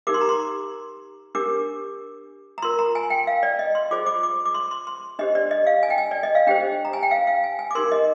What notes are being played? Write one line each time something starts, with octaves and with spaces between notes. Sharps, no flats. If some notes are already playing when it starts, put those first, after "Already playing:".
D#4 G4 A#4 D6
C6
A#5
C6
D4 G4 A#4 D6
A#5
F4 A#4 C6
A#5
G#5
G5
F5
D5
D#5
C6
F4 G#4 C5 D6
D6
D6
D6
C6
C6
C6
D4 G4 C5 D#5
D5
D#5
F5
G#5
G5
G#5
D5
D#5
F5
D4 G4 C5 G5
A#5
G#5
G5
F5
F5
G#5
G#5
D6
D#4 G4 A#4 C6
D#5